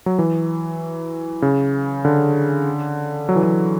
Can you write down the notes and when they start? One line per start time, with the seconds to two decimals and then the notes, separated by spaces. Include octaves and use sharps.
0.06 F#3
0.19 E3
1.42 C#3
2.05 D3
3.29 F#3
3.36 E3
3.44 F#3